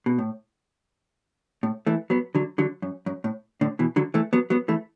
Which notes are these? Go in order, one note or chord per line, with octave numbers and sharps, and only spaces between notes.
B2
A2
A2
E3 A3
F#3 B3
D3 F#3
D3 F#3
F#2
F#2
A2
A2 D3
B2 E3
D3 F#3
E3 A3
F#3 B3
F#3 B3
E3 A3